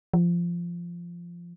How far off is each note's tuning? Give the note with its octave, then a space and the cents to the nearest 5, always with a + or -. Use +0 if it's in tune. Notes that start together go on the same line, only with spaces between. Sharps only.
F3 -15